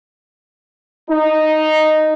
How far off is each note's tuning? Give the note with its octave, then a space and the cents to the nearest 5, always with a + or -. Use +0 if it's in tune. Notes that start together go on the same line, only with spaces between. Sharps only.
D#4 -5